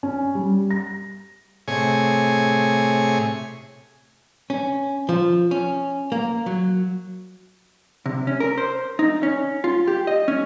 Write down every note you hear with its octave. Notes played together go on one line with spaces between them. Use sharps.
C#4
G3
A#6
A2 C3 G#4 C#5 G#5
C#4
F3
C#4
A#3
F#3
C3
C#4
A#4
C5
D#4
C#4
F4
G4
D#5
C#4